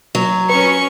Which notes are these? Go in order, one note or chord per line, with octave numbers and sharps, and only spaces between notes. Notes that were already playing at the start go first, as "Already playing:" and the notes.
F#3
C#4 B4 C#6